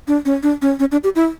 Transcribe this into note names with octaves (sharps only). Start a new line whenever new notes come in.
D4
C#4
D4
C#4
C#4
D4
G4
E4